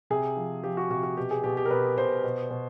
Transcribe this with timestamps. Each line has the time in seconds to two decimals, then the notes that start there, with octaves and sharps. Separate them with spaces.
0.10 C3 G#4
0.37 F3
0.63 F3 G4
0.77 F#4
0.90 C3 F#4
1.03 F#4
1.17 B2 G4
1.31 G#4
1.44 B2 G4
1.57 G4
1.66 A#4
1.71 B2 B4
1.97 B2 C5
2.24 B2
2.50 B2